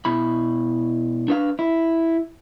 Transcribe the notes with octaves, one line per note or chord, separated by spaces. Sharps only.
B2 E4 B5
D4 B4 F5
E4